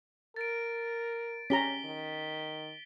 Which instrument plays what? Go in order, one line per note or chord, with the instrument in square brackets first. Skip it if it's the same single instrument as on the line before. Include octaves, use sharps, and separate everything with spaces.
[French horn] A#4 [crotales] A6 D7
[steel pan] C#4 G4 A#5 [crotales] B6 G7
[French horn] D#3